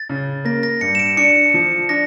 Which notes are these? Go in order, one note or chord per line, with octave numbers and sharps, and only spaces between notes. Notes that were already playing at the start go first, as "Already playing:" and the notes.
Already playing: A6
C#3
A#3 A#6
A#6
G2 C#7
E7
D7
D4 C#7
F3
D4 A#6